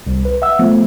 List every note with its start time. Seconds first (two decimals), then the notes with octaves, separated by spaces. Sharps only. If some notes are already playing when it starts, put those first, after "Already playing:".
0.07 C2
0.25 B4
0.42 E5 F#5 E6
0.59 F3 A3 B3